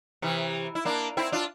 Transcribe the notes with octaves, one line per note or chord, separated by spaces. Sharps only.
C3 E3
E4
A#3 D4
C4 E4
D4 F4